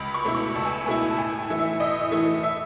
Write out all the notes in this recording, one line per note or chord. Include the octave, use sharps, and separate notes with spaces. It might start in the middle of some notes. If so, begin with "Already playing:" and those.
Already playing: C#2 B5
C#6
B2 A3 E4
C#6
C#2 A5
G#5
A5
B2 A3 E4 G#5
A5
A2 G#5
G#5
E3 A3 E4
E5
A2 D#5
E3 A3 E4
E5